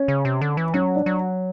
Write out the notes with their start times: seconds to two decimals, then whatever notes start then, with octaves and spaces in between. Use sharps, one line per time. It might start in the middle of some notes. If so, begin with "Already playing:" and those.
Already playing: C#4
0.08 C#3
0.25 C3
0.41 D3
0.57 E3
0.74 F#3 C#4
0.96 D4
1.06 F#3